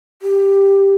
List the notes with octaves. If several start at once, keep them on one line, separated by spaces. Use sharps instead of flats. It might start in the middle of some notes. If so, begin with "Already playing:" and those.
G4